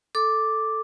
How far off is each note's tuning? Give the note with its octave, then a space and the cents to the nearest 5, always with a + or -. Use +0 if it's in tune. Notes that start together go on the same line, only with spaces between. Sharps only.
A4 +0 D6 +0